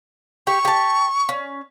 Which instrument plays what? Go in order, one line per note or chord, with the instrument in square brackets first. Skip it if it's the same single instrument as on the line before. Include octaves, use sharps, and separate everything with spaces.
[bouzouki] G4 [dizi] C#6
[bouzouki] G4 A5
C#4